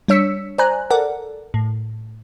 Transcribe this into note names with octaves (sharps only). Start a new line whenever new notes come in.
G3 D4 C#5 E6 B6 C#7
C5 D5 G#5 A#5 F#6
A4 A#4 D5 F#5
A2